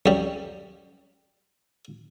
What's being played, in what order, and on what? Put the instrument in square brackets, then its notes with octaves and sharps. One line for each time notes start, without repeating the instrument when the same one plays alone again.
[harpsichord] F#2 G3